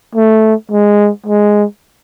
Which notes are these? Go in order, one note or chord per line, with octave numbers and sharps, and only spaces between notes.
A3
G#3
G#3